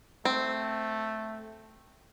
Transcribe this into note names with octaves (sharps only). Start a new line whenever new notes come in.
A3 C4